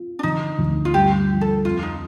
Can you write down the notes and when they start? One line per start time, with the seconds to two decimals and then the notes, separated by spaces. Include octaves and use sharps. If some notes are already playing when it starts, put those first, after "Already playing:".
Already playing: F4
0.19 D4
0.23 D3 D#4
0.58 D2
0.85 F4
0.94 G2 G4
1.30 F3
1.41 A4
1.65 F2 F4
1.83 D#4